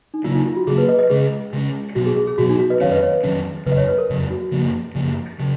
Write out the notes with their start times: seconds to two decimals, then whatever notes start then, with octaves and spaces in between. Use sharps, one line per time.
0.14 D#4
0.24 C#3 F#3 A#3 F4
0.35 D#4
0.46 F4
0.57 F#4
0.67 C#3 F#3 A#3 G#4
0.78 B4
0.88 B4 D#5
0.99 B4 D#5
1.10 C#3 G#3 C#4 G#4
1.53 C#3 G#3 C#4
1.95 B2 F#3 B3 F#4
2.06 G#4
2.17 G#4
2.27 G#4
2.38 B2 F#3 B3 F#4
2.49 D#4
2.59 F#4
2.70 B4 D#5
2.80 F2 D#3 F#3 C#4 C#5 F5
2.92 B4 D#5
3.03 C#5
3.13 B4
3.23 F2 D#3 F#3 C#4
3.66 F2 C#3 F#3 B4
3.72 D#5
3.77 C#5
3.88 B4
3.98 A#4
4.10 F2 C#3 F#3
4.31 F#4
4.51 F#2 C#3 F3 A#3
4.95 F#2 C#3 F3 A#3
5.40 C#3 F#3